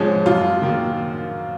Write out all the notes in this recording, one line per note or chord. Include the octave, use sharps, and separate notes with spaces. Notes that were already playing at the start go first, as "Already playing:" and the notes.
Already playing: G#2 F3 G#3 C#4
F#2 F4
D#3 A#3